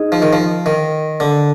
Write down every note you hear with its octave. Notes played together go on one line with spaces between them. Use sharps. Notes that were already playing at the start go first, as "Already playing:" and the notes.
Already playing: D#4 G#4 D#5
F3
D#3
F3
D#3
D3